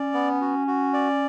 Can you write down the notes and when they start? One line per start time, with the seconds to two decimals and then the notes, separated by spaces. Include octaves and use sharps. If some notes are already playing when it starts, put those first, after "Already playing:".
Already playing: C#4 D5
0.14 B3
0.41 F#4
0.68 F#4
0.94 D5